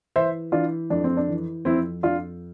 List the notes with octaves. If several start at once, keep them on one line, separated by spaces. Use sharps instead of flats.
E3 C5 E5
E3 D4 F4
F2 D4
C4
D4
E3
F2 C4 E4
F2 D4 F4